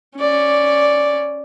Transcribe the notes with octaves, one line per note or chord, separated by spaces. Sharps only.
C#4 D5